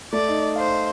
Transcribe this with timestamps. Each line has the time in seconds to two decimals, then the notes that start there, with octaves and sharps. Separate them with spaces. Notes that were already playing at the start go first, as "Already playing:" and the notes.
0.13 A3 A4 D5
0.28 D#4 D#5
0.56 C5 F5
0.68 D#5